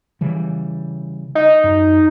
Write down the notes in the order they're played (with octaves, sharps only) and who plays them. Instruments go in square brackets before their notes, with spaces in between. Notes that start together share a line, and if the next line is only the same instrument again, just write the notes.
[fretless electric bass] C#3 E3 G3
[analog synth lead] D#4
[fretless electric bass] F#2